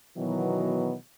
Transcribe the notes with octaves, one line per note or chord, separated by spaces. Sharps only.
B2 D#3 E3 F#3 B3